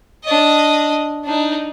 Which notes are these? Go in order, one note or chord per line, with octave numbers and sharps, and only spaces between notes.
D4 D#5
D4 D#4